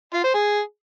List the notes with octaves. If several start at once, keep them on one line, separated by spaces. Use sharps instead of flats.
F4
C5
G#4